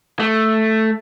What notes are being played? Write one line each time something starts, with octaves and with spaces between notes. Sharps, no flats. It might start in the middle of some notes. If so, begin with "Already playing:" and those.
A3